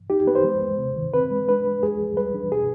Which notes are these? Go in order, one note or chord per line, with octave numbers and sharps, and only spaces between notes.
D#4 G4
B3 B4
C5
G#3
D#2
C3
D#3
C4 B4
G#3
D4 B4
G#3
D#2 G#4
D#2
G3 B4
D4
B2 G#4